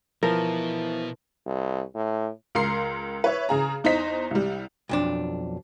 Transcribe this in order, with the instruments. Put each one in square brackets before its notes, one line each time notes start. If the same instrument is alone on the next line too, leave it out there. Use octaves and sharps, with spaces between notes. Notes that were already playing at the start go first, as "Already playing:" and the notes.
[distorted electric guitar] B2 [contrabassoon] E3 [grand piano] F3 [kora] A#4
[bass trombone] C2
A2
[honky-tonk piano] C#2 A#4 C6 C7
B4 C#5 E5
C#3 G#4 A#5
E2 D#4 C5 D#5 B6
C2 G3
[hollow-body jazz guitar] B1 F2 D4